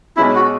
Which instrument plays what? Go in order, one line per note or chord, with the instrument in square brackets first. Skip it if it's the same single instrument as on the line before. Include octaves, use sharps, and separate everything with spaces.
[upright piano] B1 B2 G#3 C#4 [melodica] E4
[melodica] F#4